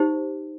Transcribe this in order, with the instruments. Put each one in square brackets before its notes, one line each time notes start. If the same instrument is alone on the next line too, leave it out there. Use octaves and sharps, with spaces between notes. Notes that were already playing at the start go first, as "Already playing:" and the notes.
Already playing: [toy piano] D#4 G4 C5